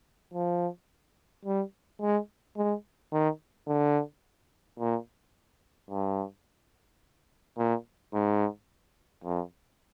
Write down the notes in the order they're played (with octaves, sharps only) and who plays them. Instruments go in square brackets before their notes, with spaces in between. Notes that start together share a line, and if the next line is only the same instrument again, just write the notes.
[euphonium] F3
G3
G#3
G#3
D#3
D3
A#2
G2
A#2
G#2
F2